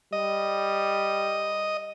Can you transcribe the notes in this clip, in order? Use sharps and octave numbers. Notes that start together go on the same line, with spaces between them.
G3 D#5